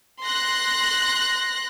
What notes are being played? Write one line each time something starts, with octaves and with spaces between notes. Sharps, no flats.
C6 F#6 A#6